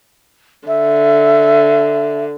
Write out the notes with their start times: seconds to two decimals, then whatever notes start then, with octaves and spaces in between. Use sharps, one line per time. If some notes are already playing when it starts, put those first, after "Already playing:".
0.68 D3 E5